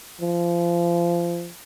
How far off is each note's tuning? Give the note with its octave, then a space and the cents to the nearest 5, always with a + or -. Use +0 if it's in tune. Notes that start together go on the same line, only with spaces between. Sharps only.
F3 -25